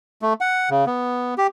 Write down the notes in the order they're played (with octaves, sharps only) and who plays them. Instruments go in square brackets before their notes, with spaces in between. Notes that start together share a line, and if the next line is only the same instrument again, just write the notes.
[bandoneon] A3
F#5
C#3
B3
G4